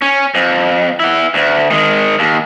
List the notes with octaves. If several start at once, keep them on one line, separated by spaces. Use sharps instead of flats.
C#4
F2
E4 F#5
D2
D#3 G#3
D#2